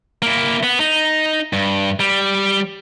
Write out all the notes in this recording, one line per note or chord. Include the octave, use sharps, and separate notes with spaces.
A#3 E4
B3
D#4
G2
G3